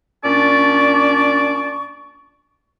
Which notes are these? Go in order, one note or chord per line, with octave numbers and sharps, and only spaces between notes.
A#2 C#4 D4 D5 A5 C#6